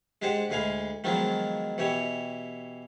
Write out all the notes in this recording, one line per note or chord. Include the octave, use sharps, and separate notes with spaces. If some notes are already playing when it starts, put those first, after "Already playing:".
G#3 D4 G4 C5 F#5
D2 G#3 G#4 F5 B5
D#3 F3 F#3 G#3 B3 D4
B2 E3 G4 C#5